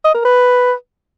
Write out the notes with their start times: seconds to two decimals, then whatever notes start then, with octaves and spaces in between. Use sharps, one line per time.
0.04 D#5
0.15 A#4
0.25 B4